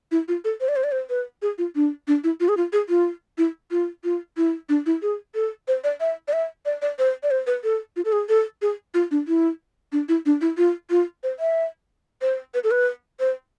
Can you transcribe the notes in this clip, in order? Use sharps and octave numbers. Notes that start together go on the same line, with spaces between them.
E4
F4
A4
C5
D5
C5
D5
C5
B4
G#4
F4
D4
D4
E4
F4
G#4
F4
G#4
F4
E4
F4
F4
E4
D4
E4
G#4
A4
C5
D5
E5
D5
E5
D5
D5
C5
D5
C5
B4
A4
F4
A4
G#4
A4
G#4
F4
D4
E4
D4
E4
D4
E4
F4
F4
C5
E5
C5
B4
A4
B4
C5